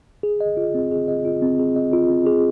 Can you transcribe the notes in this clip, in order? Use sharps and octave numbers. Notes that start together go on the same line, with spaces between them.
G#4
D#5
F4
C4
G#4
D#5
F4
C4
G#4
D#5
F4
C4
G#4